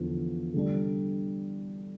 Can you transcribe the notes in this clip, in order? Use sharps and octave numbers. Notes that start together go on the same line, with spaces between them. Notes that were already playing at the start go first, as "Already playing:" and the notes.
Already playing: E2 D3 F3 B3
D3 G3 D4